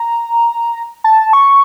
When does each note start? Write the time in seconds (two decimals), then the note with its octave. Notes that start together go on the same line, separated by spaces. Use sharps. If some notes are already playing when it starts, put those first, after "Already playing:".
Already playing: A#5
1.04 A5
1.33 C#6